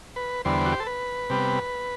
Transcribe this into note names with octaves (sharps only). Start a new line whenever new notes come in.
B4
E2 D3 G3 B3 C5
F#4
G4
A4
B4
C3 G3 B3